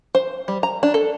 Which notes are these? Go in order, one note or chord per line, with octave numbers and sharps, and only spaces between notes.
C5
G3
A#5
D4
A4